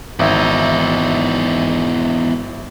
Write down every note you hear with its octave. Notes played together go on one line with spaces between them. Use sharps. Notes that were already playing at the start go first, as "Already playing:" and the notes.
G#1 E2 D#4 E5